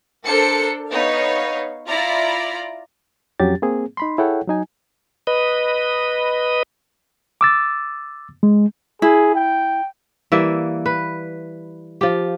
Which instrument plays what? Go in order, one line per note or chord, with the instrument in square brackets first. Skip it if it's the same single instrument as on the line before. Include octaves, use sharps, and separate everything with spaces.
[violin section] D4 A4 A#4 C5 C#7
B3 D#4 C#5 F5
E4 F4 D5 A#5
[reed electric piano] F2 F#3 C#4 G4 A6
A#3 C4 G#4
D#4 B5 C6
E4 G#4 A4 C#5 F#5 G5
F#3 D#4 G#5
[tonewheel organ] B4 D#5
[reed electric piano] D6 E6 A6
G#3
[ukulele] E4 [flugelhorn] G#4
[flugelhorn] G5
[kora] E3 G3 A#3 E5
B4
F3 G4